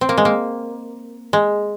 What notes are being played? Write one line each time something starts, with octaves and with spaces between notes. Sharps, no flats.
C4
A#3
G#3
A#3
G#3